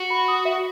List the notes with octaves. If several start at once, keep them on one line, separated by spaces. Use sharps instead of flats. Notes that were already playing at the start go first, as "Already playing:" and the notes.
Already playing: F#4
B5
D#6
E5